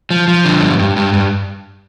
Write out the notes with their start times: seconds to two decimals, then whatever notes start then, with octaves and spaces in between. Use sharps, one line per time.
0.10 F3
0.28 F3
0.45 D3
0.62 G2
0.79 G2
0.96 G2
1.13 G2